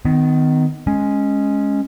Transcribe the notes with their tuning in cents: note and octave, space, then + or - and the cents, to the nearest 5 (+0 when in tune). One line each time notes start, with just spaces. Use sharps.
D#3 +0 B3 +40
G#3 +0 C#4 +0